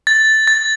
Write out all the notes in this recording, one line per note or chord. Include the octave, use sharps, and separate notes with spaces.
A6
A6